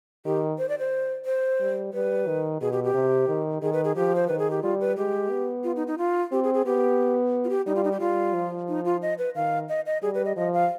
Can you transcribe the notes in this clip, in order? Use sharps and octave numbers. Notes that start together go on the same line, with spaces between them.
D#3 G4
C5
D5
C5
C5
G3
G3 B4
D#3
B2 G#4
G4
G4
C3
D#3
D#3 G#4
B4
G#4
F3 G4
C5
D#3 B4
G#4
G4
G3 F4
B4
G#3 G4
B3
F4
D#4
D#4
F4
C4 G4
G#4
G#4
B3 G4
F4
G4
G3 D#4
F4
D#4
G4
G3 F4
F3
D#4
F4
D#5
B4
D#3 F5
D#5
D#5
G3 G#4
B4
D#5
F3 D#5
F5